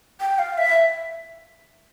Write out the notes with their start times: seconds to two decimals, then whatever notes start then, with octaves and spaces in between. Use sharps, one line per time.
0.21 G5
0.39 F5
0.58 E5